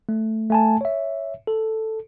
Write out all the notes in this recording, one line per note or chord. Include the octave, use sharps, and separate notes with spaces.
A3
A3 G#5 A5
C#5 E5
A4